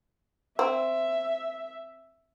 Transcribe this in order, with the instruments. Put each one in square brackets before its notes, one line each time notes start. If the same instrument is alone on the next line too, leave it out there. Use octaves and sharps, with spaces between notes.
[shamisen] C4 [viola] E5